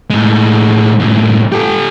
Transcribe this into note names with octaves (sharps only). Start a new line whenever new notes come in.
A2 G#3
F#2 A2
G4 A4